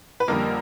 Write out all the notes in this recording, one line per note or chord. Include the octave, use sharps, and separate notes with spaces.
B4
F2 D3 G3 A#3 A#4